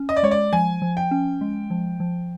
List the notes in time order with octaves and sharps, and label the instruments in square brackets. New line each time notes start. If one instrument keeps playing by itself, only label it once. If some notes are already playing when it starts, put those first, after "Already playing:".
Already playing: [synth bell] C#4
[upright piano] D#5
D5
[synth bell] G#3 [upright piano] C#5
[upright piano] D5
[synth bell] F3 [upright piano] G#5
[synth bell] F3
[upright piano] G5
[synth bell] C#4
G#3
F3
F3